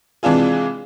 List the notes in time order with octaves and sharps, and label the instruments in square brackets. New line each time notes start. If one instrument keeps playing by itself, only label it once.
[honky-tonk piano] C3 E3 G#3 D4 F4 G#4